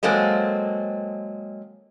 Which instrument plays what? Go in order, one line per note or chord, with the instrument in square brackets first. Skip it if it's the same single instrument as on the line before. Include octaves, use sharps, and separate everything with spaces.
[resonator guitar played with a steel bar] F#3 G#3 A#3 C4 A4 D#5